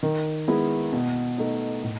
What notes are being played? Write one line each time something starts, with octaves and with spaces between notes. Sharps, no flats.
D#3
G#3 B3 E4
B2
A3 D#4
A2